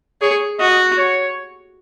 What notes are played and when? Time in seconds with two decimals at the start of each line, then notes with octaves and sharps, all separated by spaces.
0.21 G#4 C#5
0.59 F#4 D#5
0.98 C#5